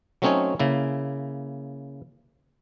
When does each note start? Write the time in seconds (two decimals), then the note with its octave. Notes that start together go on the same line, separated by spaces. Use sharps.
0.22 F#3 A3 C4 C#4 D#4 C#5
0.60 C#3 A#3 E4